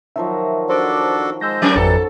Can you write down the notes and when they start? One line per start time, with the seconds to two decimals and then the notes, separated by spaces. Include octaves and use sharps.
0.16 D#3 F3 F#3 E5
0.69 D4 F#4 A4 C5 D6
1.41 G#3 C5 E6 G6 A#6
1.62 F#3 C#4 A#4
1.76 G#1 F2 E3 F#3 G3 A4